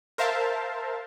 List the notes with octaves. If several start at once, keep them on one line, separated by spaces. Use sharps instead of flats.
A#4 C5 E5 F5 A5